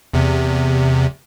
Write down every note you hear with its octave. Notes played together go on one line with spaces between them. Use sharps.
E2 C3